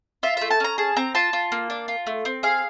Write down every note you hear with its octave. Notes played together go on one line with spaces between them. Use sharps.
F4 E5
A3 E5
A5
C#4 A#5
G#4 A5
C4 A#5
F4 A5
F4
A#3
D4
F4
A3
C4
G#4 F5